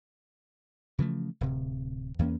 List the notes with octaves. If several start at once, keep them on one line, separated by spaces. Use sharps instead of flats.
C#3 E3 F3 A3
D1 C3
E2 E3 A#3 C#4